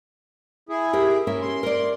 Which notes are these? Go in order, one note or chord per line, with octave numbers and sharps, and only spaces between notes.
E4 G#4
G4 A#4
C#4 A#4 E5
C6
A#4 D5